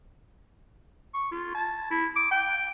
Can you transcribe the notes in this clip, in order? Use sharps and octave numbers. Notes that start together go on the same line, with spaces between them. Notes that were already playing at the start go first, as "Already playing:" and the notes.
C#6
F4
A5
E4
D6
G5